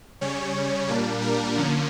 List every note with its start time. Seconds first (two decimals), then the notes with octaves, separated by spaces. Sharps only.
0.21 C#3 G3 C#4 C#5
0.88 A#2 G3 A#3 D4
1.22 A#4
1.55 D3 F3 A#3 C#4